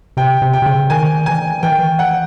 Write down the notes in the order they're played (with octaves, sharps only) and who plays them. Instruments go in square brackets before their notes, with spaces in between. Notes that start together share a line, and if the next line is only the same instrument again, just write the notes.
[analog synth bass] C3 [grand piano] G5
[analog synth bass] C3
[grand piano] G5
[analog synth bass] C3
C#3
[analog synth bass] D#3 [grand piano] G#5
[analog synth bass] E3 [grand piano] G#5
[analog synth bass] E3 [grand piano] G5
[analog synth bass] D#3
E3
[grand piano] F#5